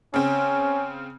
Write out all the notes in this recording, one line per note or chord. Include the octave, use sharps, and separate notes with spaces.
C#3 C4 C#4